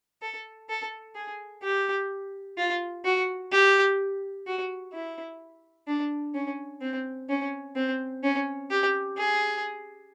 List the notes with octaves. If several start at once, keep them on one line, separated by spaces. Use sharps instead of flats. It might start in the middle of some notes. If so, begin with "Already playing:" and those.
A4
A4
G#4
G4
F4
F#4
G4
F#4
E4
D4
C#4
C4
C#4
C4
C#4
G4
G#4